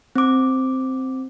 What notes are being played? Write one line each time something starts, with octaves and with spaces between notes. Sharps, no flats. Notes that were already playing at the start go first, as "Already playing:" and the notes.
C4 D6